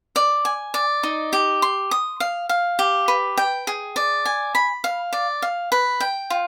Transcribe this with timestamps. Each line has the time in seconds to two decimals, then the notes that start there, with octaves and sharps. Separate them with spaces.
0.16 D5
0.45 G#5
0.74 D5
1.03 D#4
1.33 G4
1.62 C6
1.91 D#6
2.20 F5
2.49 F5
2.79 G4
3.08 B4
3.37 G5
3.67 G#4
3.96 D5
4.25 G#5
4.55 B5
4.84 F5
5.13 D5
5.42 F5
5.72 B4
6.00 G5
6.30 F4